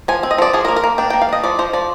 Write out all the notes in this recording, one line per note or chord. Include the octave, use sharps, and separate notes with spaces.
F3 G#5
C4
D#5
F3 D5
F3 G#4
A#4
A#3
A#4
A#3
D4 G5
A#3 G5
F5
D4 D#5
F3 D5
F3 C5
F3 D5